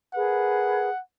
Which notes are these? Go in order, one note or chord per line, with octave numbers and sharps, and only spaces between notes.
G#4 A#4 B4 F#5